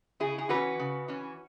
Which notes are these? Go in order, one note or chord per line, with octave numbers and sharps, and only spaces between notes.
C#3 E4 G#4
G#4
E3 C#4 F#4 B4
C#3
E3 C#4